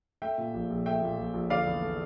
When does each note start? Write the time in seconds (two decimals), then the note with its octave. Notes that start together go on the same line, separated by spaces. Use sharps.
0.22 A3 E5 G5
0.38 A#2
0.54 A#1
0.70 A#1
0.85 A3 E5 G5
1.02 A#2
1.18 A#1
1.34 A#1
1.50 D3 D5 F5
1.66 E2
1.82 A3